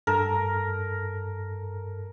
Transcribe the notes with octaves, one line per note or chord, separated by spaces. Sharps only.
G2 A4 A#4 A5